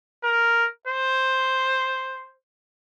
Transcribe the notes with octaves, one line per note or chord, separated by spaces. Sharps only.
A#4
C5